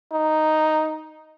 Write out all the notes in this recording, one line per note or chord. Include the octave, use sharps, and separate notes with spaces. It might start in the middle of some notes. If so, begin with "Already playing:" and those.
D#4